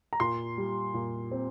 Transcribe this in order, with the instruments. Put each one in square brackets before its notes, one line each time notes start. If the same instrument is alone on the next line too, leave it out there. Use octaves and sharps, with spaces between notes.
[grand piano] A#5
[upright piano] A#2 [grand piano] C6
[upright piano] G3
A#2
C4